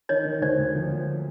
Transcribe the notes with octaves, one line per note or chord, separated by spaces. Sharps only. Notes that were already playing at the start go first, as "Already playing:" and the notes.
D#3 C#5 D#5
D#3
D2 C5 D5
D2
F3
F3